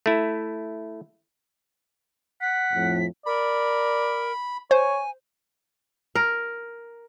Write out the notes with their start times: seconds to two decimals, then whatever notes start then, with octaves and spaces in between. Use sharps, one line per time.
0.06 A3 E4
2.41 F#5 B6
2.73 F2 A2 F3
3.26 A#4 D5 B5
4.71 C5 C#5 G#5
6.15 A#4